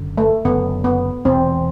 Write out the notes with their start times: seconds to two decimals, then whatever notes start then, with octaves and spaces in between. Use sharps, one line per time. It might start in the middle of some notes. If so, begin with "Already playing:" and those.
Already playing: F#1 F#2 D3
0.18 A3
0.45 F#1 F#2 D3 B3
0.84 B3
1.25 E1 E2 C3 C4